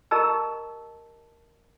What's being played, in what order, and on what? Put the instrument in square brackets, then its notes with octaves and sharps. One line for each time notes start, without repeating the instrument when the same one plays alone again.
[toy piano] G4 A#4 D#5 A5 A#5 E6